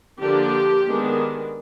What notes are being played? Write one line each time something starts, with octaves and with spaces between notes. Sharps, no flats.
D3 F3 A#3 D4 G4
D#3 G#3 B3 D4